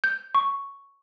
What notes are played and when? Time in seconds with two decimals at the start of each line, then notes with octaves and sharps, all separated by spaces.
0.04 G6
0.35 C#6